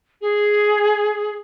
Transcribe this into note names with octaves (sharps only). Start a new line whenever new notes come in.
G#4